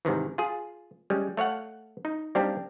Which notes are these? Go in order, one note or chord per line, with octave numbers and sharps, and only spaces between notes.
G#2 C3 D#3 E3
F4 G#4
G3 G#3 C#4
A3 C#5 F5 F#5
D#4
G3 A#3 C4 D4 D#4 G4